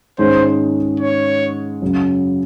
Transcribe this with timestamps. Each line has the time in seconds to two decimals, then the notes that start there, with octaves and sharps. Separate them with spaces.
0.18 G#2 D#3 G#3 C#4 C5
1.00 C#5
1.82 F#2 C#3 F#3